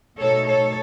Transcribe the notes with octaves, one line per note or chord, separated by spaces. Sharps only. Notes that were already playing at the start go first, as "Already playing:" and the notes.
B2 A3 D#4 A4 C#5
A4 C#5